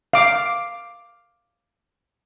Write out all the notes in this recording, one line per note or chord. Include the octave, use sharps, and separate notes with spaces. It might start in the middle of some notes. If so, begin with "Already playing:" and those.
F5 D6